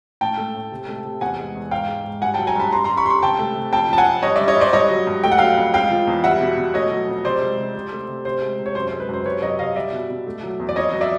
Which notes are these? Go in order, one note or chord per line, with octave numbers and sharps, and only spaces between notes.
A2 G5 A5
A3
A2
C3
A3
C3
E2 F#5 G#5
G#3
E2
G#2 F5 G5
G#3
G#2
G2 F#5 G#5
G5 A5
F#3
G#5 A#5
G2 A5 B5
G2 A#5 C6
A#5 C6
G3
B5 C#6
G2 B5 C6 C#6
C3 G5 A5
A3
C3
F2 G5 A5
F3 A5
F#5 G#5
F2
G2 C#5 D#5
G3 D5 E5
C#5 D#5
G2 C5 D5
G2 C#5 D#5
F#3
G2
A3 G5
F#5
F#3 F5 G5
F2
G#3 F5 G5
F3
E2
G3 E5 F#5
B2
B2
A3 C#5 D#5
F#3
F2
C3 C5 D5
G#3
C3
C3
A3
C3
C3 C5
G#3
C3
C#5
F#2 C5
C5
G#3
B4
F#2 C5
C5
C3 B4 C#5
F#3 C#5 D#5
C3 D#5 F5
G3 D5 E5
B2
B2
A3
F#3
E2
D5
F2 C#5 D#5
F#3
D5 E5